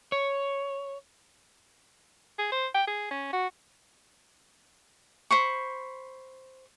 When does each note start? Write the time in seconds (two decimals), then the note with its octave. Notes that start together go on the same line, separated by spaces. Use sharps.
0.12 C#5
2.39 G#4
2.52 C5
2.74 G5
2.87 G#4
3.11 C#4
3.33 F#4
5.31 C5 B5 C#6